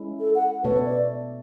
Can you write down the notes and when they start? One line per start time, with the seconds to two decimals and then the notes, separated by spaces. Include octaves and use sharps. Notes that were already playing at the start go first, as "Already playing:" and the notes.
Already playing: G#3 C#4 E4
0.20 A4
0.35 F#5
0.63 B2 A3 D4 A4 B4 C#5
0.86 D5